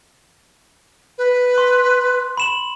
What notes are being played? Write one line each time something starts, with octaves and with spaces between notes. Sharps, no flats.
B4
C6
B5 E7 F#7